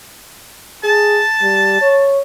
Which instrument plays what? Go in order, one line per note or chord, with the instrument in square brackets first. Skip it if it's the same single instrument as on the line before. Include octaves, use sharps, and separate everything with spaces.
[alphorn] G#4 [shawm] A5
[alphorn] G3
C#5